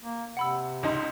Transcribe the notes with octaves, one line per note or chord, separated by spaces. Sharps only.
A#3
C3 F#5 B5 E6
C#2 D#4 C6